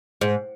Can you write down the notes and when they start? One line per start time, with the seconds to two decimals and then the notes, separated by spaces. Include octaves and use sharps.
0.21 G#2